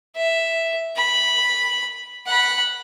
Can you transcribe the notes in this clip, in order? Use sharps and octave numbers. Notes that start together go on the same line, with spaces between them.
E5
B5
F#5 B5